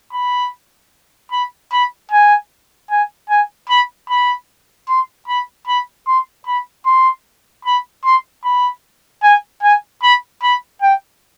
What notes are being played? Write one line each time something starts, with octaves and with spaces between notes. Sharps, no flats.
B5
B5
B5
G#5
G#5
G#5
B5
B5
C6
B5
B5
C6
B5
C6
B5
C6
B5
G#5
G#5
B5
B5
G5